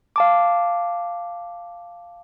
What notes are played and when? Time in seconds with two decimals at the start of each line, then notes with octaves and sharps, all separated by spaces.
0.16 F5 A5 D6